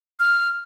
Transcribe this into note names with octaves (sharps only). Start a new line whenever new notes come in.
F6